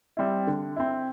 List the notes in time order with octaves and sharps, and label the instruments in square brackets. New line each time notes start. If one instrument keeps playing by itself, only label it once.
[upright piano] G3 C4 E4
D3
C4 E4